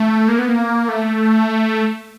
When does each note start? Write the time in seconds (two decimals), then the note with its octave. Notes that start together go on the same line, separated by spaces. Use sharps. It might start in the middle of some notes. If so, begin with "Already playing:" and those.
Already playing: A3
0.28 A#3
0.39 B3
0.49 A#3
0.89 A3